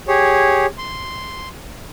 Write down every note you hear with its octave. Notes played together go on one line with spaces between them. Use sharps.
G4 G#4 C#5
C6